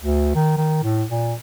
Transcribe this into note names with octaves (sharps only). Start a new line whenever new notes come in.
D2
D#3
D#3
A2
A#2